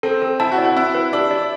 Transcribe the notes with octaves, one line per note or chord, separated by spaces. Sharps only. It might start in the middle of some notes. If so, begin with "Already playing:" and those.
C4 A4
A4
E4 A5
F#4
D5
F#4
C4 E4
B4
D4 G4
D5